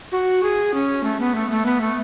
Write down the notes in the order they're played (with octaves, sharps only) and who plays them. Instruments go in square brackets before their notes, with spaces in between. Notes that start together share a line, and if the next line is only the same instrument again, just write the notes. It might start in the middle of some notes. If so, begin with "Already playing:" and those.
[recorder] F#4
G#4
C#4
A3
B3
A3
A3
B3
A3